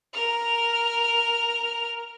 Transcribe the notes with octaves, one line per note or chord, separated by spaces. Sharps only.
A#4 F6